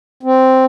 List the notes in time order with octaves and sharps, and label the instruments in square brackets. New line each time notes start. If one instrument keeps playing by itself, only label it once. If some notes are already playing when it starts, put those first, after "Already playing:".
[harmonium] C4